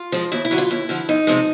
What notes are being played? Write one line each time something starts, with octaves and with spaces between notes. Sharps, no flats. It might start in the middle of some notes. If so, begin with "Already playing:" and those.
Already playing: F4
F3 G#3
D#2 E4
E4
D3 F#3
F4
D#2 E4
D3 F3
F2 D#4
C3 F3 G#3